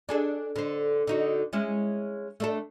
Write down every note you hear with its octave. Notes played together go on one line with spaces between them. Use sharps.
D4 G#4 A4
D3 C5
D3 D#4 F#4
G#3 C#4 E4
A3 D4 A4